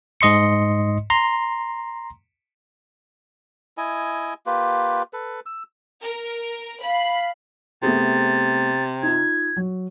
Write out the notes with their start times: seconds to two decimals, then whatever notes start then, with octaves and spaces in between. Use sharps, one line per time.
0.21 G#2 D#5 C6 C#7
1.10 A#5 C6
3.77 E4 D#5 G#5
4.46 A#3 F4 G4 B4
5.13 A4 B4
5.46 E6
6.04 A#4
6.84 F5 B5
7.83 C3 A3 B3 G#4 A6
9.03 D#4 F4 G#6
9.57 F#3